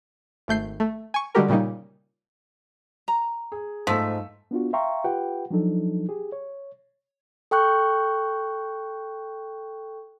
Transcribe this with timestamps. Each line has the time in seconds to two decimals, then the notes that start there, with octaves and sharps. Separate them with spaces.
0.48 G#1 A3 G6 C7
0.80 A3
1.14 G#5 C#6
1.35 D3 G3 G#3 F#4 G4 A#4
1.48 A#2 C#3 G3 A#3 D#4
3.08 A#5
3.52 G#4
3.87 G#2 F3 A3 E6 B6
4.51 B3 D4 F4 F#4
4.73 E5 F5 G5 A#5 C6 C#6
5.04 F4 G4 B4 F#5 G5
5.51 F3 F#3 D4 D#4 A4
6.09 G4 G#4
6.32 C#5
7.51 A4 G5 C#6 F#6 G6